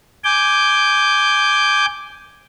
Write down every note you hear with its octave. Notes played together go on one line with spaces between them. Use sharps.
G#5 D6 G6